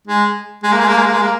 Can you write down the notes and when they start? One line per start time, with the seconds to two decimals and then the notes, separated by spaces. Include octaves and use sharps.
0.07 G#3
0.63 G#3
0.72 A#3
0.80 G#3
0.88 A#3
0.98 G#3
1.06 A#3
1.14 G#3
1.22 A#3